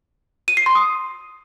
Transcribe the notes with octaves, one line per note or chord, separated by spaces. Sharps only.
D#7
C7
C6
D#6